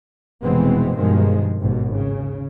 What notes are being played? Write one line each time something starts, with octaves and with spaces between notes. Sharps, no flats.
F1 B2 E3 G#3 B3 C4
G2 B2 D#3 F3 G#3
G#1 D#2 B2
C#3